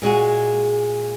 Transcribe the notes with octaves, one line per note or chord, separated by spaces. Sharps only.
A#2 G#3 F#4 G#4